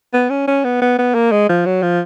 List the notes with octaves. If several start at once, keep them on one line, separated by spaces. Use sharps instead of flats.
B3
C#4
C#4
B3
B3
B3
A#3
G#3
F3
F#3
F3